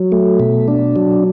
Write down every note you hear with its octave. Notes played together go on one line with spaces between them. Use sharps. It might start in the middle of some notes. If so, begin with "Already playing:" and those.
Already playing: F#3
A3
B2
D4
F#3